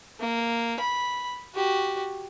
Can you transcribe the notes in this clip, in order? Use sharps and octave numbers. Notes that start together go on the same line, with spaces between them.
A#3
B5
F#4 G4